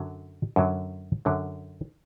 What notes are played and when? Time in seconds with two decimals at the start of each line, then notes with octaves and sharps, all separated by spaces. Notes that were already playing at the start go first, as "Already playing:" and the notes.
Already playing: F#2 D3 F#3
0.56 F#2 D3 F#3
1.25 F#2 D3 F#3